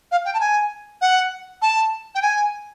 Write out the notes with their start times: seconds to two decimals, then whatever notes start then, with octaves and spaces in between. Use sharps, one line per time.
0.11 F5
0.25 G5
0.34 A5
0.40 G#5
1.01 F#5
1.61 A5
2.15 G5
2.22 G#5